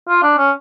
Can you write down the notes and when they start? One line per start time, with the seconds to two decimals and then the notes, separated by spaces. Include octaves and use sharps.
0.09 F4
0.23 D4
0.38 C#4